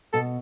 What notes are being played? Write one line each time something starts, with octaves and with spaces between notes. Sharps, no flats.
B2 A4